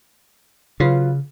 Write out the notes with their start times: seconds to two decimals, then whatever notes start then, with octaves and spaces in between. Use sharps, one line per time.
0.80 C#3 F#3 F4 B4